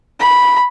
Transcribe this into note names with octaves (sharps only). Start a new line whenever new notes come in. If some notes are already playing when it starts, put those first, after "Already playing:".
B5